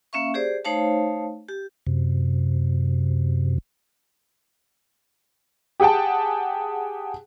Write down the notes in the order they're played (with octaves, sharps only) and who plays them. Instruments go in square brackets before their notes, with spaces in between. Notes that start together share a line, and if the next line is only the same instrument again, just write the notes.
[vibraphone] A#3 C#4 E5 F5 C#6
G4 G#4 C5 D5
A3 D#4 C5 C#5 F5 A5
G4
[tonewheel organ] F#2 C3
[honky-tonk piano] G4 G#4 F#5 G5 A5